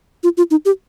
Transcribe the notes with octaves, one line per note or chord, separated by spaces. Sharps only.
F4
F4
D#4
G4